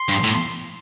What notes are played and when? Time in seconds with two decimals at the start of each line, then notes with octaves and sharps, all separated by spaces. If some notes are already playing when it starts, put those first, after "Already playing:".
Already playing: C6
0.09 G2
0.23 A2